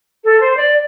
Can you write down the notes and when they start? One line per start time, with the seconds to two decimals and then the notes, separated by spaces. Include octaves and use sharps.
0.24 A4
0.41 C5
0.57 D5